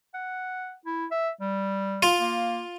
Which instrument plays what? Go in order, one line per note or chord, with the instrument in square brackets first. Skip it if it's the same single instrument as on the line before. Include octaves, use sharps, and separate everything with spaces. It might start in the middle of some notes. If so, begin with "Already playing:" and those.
[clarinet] F#5
E4
E5
G3
[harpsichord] F4
[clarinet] A#3